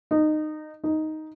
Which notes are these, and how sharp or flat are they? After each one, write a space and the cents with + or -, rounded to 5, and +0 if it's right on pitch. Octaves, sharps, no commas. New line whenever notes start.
D#4 -20
D#4 +5